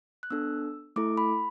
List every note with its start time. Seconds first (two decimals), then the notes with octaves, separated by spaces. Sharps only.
0.23 F#6
0.30 B3 D4 A4 E6
0.96 A3 E4 A4 D6
1.17 B5